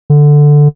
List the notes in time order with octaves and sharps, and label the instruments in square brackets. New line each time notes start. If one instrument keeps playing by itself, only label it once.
[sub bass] D3